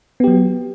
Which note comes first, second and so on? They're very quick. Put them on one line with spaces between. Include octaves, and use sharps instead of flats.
B3 G4 F#3